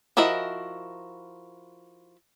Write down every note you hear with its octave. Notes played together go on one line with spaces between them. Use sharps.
F3 E4 F#4 A#4 D#5